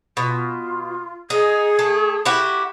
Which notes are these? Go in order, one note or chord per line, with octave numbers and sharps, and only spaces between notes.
B2 F4
D#4 G#4
A3
E4 F#4 G4